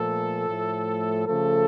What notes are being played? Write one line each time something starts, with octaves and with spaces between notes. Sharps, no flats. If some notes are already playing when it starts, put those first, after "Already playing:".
Already playing: A#2 F3 A3 A4
A2 F3 A3
C#3 F3 A3 A4